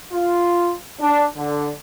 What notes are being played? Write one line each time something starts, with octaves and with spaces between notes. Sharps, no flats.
F4
D4
D3